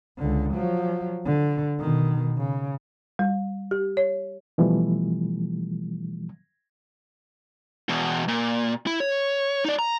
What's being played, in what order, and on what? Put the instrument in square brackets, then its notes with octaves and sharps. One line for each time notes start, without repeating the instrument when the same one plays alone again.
[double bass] C#2 D3
F3 F#3
D3
B2 D#3
C#3
[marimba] G3
G4
C#5
[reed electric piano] B2 E3 F3 G3 A3
[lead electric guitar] E2 B2
A#2
E4
C#5
D#4 D5
A#5